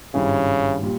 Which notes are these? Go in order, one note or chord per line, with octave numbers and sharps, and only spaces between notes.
G#1 G2 C#3 G3 C#4 E4
A#2 G3